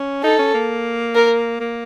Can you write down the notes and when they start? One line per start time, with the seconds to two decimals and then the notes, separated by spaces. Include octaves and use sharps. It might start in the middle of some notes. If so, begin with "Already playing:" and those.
Already playing: C#4
0.24 D#4 A4
0.39 C#4
0.54 A#3
1.15 A#4
1.60 A#3